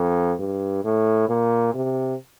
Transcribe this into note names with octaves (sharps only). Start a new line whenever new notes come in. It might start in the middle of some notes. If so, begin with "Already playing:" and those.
Already playing: F2
G2
A2
A#2
C3